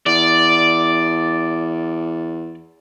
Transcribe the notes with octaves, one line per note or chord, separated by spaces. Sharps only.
E2 D5